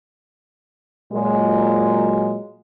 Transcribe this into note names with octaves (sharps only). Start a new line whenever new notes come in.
A#2 F#3 G#3